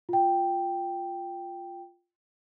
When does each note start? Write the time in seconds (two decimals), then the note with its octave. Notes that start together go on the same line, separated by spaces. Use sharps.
0.09 F4 G5